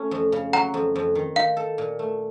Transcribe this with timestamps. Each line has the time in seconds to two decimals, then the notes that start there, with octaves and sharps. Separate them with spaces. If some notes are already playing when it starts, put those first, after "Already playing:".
Already playing: A3 C#4
0.11 F2
0.32 C#3
0.53 F#3 F#5 A#5
0.74 F2
0.96 F2
1.15 D#3
1.36 D#4 F5
1.57 A4
1.78 A#2
1.99 A3